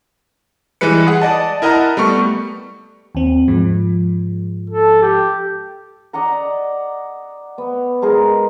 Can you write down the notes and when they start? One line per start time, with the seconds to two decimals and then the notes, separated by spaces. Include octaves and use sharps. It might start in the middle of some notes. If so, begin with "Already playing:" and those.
0.81 E3 G3 G#3 B4 C#7
1.07 G#4 F#5
1.22 D5 D#5 A5
1.62 E4 A#4 D#5 F#5 A5 A#5
1.97 G3 A3 B3 C#6
3.15 D#2 C4
3.48 G#2 F3 G#3
4.70 A4
5.02 G4
6.13 D5 D#5 F#5 A#5
7.58 B3
8.02 G#3 D#4 G#4 A#4